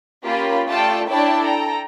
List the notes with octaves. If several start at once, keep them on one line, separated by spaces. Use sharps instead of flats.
A#3 C#4 F4 G4 B5
A3 F4 A4 D5 G5 A5
D4 E4 C#5 D5 G5 A5
A4 G5 A#5